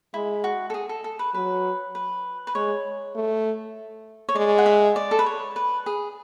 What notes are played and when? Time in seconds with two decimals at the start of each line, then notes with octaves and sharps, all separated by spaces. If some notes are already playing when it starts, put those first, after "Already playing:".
0.14 G#3 E4
0.44 F#4
0.70 A4
0.74 G#4
0.89 A4
1.04 A4
1.19 B4
1.34 F#3 B4
1.95 B4
2.47 B4
2.55 G#3 C#5
3.15 A3
4.29 C#5
4.35 G#3 D5
4.58 F#5
4.66 E5
4.96 D5
5.11 A4
5.19 B4
5.26 C#5
5.56 B4
5.86 G#4